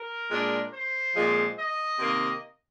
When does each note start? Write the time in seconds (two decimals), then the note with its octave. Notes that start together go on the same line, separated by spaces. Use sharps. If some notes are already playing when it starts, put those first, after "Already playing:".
Already playing: A#4
0.31 A#2 G#3 D4
0.73 C5
1.15 A#2 F3 G#3 C4
1.57 D#5
1.99 C3 D#3 A#3